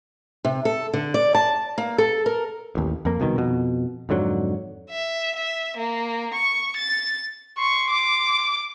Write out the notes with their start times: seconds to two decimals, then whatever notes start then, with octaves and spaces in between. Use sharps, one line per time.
0.45 C3
0.65 A4
0.93 D3
1.14 D5
1.35 A5
1.78 A#3
1.98 A4
2.26 A#4
2.75 A1 D#2
3.05 F2 A#3
3.20 C2 B2 D#3
3.36 F2 B2
4.09 F2 G#2 D3 F#3
4.91 E5
5.36 E5
5.77 A#3
6.34 C#6
6.77 A6
7.58 C6 C#6
7.91 D6